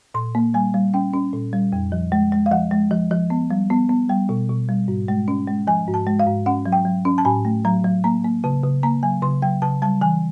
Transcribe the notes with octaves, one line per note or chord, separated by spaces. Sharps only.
A#2 C6
A#3
G3 G#5
G3
C#4 G5
C#4
A#2
G3
F2
F3
G#3
G#3
F5
F3 F#5
G#3
F3
F3
B3
G3
B3
B3
G3 G5
B2
B2
G3
G#2
G#3
C#4
G#3
F3 G#5
G#2
A5
G#3
F5
G#2
C#4 F#5
F#3
G5
F#3
C#4
A5
A2 G#5
A3
F#3 A#5
F#3
A#3 A#5
A#3
C#3 A5
C#3
A#3 A#5
F#3 G#5
C#3 C6
F#3 G5
C#3 A5
G3 A5
E3 G#5